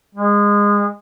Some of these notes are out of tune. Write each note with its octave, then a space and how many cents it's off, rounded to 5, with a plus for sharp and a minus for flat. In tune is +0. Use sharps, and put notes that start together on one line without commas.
G#3 -20